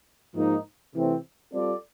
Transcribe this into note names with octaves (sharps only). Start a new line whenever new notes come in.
G#2 F3 A#3 D#4
C3 E3 A3 C4
G3 C4 F4 A4 D5